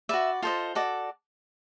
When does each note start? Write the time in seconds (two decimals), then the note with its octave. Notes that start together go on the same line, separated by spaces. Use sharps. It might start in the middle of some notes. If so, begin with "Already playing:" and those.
0.09 F#4 B4 D5 E5
0.43 F4 A4 C5 D#5
0.75 F#4 A4 D5 D#5